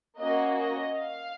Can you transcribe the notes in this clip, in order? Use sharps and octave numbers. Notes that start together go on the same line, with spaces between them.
A#3 C#4 F#4 D#5
D#5
F5